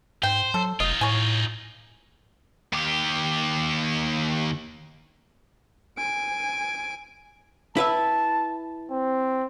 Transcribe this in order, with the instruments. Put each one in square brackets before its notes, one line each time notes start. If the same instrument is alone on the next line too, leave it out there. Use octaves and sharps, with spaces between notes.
[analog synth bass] G#2 [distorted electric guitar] C5 [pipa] G5
[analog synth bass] F#3 [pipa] A4
[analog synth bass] F1 [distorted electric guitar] D#4 F4 [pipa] D#5
[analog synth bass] A2 [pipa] C#5 G#5
[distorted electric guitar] D#2 G4
[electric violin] G#5 D7
[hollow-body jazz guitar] E4 B4 E5 [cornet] A5
[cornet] C4